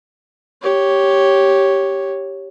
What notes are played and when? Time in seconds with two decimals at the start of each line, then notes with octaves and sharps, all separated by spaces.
0.62 G4 C#5